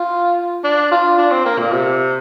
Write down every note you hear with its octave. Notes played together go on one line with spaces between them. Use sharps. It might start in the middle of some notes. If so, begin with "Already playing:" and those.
Already playing: F4
D4
F4
D4
C4
A#3
A#2
C3